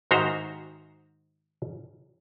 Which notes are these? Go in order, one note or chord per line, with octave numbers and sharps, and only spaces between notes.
G#2 D#3 F#4 C5 E5 A#5